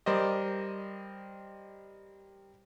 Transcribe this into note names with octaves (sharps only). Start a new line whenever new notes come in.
G3 A#4 C5 D5 D#5